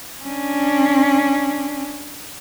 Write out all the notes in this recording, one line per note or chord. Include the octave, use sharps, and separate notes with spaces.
C#4 D4